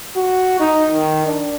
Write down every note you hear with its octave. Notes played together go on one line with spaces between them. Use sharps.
F#4
D#4
D#3
D4